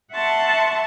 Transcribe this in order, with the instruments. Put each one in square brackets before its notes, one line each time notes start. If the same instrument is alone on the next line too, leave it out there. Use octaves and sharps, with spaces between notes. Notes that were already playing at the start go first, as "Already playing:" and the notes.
[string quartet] E5 F#5 A5 C6 C#6